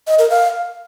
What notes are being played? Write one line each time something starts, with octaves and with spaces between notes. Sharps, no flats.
D#5
A#4
F5